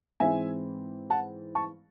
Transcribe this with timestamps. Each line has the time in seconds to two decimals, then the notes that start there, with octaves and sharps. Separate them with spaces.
0.20 G#2 E3 C4 E5 G#5
1.10 F#5 A5
1.55 A5 C#6